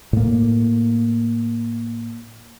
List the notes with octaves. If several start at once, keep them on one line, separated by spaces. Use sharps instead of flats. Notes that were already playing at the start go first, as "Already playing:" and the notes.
A2 A#3